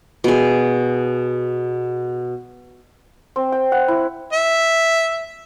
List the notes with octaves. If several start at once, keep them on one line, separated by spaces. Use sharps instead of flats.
B2 G#4
C4
G5
F#5
E4
E5